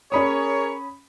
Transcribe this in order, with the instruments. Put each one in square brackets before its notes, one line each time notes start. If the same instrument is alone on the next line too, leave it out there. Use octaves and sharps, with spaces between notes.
[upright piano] C#4 B5 D#6 [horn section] G#4 A#4 C#5